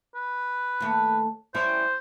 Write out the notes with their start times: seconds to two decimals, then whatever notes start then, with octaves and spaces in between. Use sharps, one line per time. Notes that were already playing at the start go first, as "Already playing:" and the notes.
0.15 B4
0.80 D#2 A3
1.54 G3 C#4 E4 C5